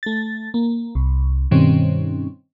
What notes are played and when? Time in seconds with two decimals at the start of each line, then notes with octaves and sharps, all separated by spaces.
0.03 A3 A6
0.54 A#3
0.95 C2
1.51 G2 B2 D#3 G3 C4 C#4